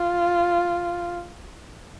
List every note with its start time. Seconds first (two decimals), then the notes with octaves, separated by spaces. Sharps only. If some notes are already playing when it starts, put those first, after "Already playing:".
Already playing: F4